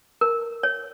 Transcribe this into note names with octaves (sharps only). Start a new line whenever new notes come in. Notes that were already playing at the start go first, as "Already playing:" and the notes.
A#4
C#5